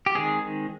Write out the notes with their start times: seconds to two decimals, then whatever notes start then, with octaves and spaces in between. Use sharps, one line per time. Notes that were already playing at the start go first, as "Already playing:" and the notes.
0.06 G4
0.15 D#3 G#3 C4 G#4